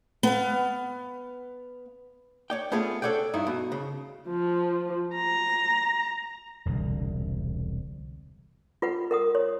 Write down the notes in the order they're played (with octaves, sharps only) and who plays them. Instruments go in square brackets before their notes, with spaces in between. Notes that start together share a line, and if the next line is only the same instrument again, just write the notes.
[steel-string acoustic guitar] B3 F5
[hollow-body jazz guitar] C#5 D5 G5
A3 B3 C#4 F4 G#4
A4 C#5 D5 F#5 G5
G2 D#4 E4
B2
C#3
[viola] F3
A#5
[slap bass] E1 C2 D3
[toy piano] F4 B4 F#5
A#4 F#5 D#6
C#5